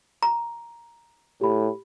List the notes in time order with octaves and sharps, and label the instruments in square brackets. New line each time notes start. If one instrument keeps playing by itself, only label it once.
[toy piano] A#5
[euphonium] A2 [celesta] G4 B5